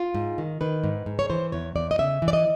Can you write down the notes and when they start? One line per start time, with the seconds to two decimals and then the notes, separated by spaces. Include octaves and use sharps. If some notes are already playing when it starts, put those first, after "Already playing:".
Already playing: F4
0.15 G#2
0.38 D#3
0.61 D#3 B4
0.84 G#2
1.06 G#2
1.19 C#5
1.30 E3 C5
1.52 E2 C#5
1.75 E2 D5
1.91 D#5
1.99 C#3 E5
2.22 E3
2.28 D5
2.33 D#5